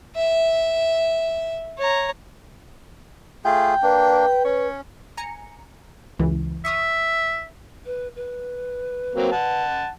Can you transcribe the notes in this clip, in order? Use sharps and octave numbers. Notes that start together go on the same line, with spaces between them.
E5
C#5 A#5
A3 F4 G#4 G5
A#3 D4 B4
C#4 C#5
G#5 A#5 C#7
C#2 F#2 E3
E5 C#6 D#6 F6
B4
B4
F#3 A#3 C4
F#5 A5